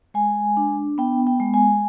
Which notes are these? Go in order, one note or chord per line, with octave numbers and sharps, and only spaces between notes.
G#3 G#5
D4
B3 G5
G5
G#3
G#5